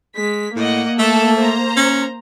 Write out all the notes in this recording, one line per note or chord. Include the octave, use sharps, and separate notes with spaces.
G#3 B6
A2 A#3 D5 D#5 F#5
A3 A4
C5 A#5
C#4